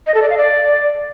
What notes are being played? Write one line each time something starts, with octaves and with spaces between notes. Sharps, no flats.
D#5
A4
D5
F5
D5